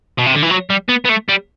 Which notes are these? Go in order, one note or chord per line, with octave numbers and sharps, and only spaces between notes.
B2
C3
D3
E3
F#3
G3
B3
B3
A3
G3